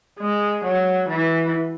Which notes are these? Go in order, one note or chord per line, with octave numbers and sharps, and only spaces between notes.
G#3
F#3
E3